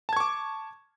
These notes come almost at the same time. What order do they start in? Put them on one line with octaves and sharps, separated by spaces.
A5 G#6 C#6 D6